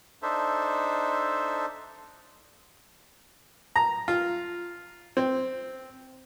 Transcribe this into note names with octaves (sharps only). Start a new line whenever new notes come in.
D4 D#4 A4 C5 E5
A#5
F4
C4